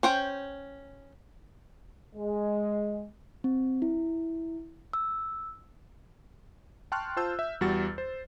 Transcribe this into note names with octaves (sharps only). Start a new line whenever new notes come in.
C#4 C5 G5
G#3
C4
E4
E6
G5 A5 C6 C#6 F6 F#6
F4 C5 A5 E6 G6
E5
E2 G3 F#4 A6
C5